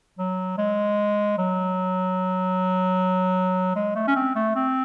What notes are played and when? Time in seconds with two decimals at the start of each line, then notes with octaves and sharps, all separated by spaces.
0.19 F#3
0.58 G#3
1.38 F#3
3.76 G#3
3.95 A3
4.07 C#4
4.16 C4
4.35 A3
4.56 C4